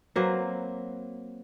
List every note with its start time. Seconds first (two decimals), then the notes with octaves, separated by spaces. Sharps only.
0.16 F#3 A#3 C4 B4